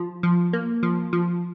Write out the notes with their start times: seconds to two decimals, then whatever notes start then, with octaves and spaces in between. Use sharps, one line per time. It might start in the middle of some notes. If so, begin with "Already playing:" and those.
Already playing: F3
0.23 F3
0.53 A#3
0.83 F3
1.13 F3